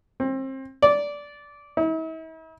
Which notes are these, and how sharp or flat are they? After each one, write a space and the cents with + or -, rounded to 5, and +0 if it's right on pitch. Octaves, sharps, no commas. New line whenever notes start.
C4 +30
D5 -15
E4 -45